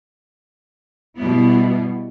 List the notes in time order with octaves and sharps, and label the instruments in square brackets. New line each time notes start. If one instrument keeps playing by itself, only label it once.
[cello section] B2 G3 B3 E4